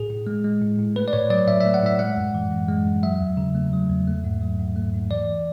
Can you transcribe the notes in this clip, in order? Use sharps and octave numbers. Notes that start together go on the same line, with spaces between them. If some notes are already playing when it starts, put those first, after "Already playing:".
Already playing: A2 G#4
A2
G#3
G#3
A2
A2
A3 B4
D5
A2 C#5
F#3 D5
A2 E5
E5
A3
F#5
A2 E5
G#3 F#5
F#2
E3
F#2
G#3
F#2
F#3 E5
E2
C#3
A3
F#3
E2
A3
G#2
F#3
G#2
A3
G#2
E3 D5